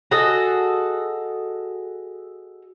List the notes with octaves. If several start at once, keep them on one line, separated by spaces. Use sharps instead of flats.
F#4 G#4 A4 D#5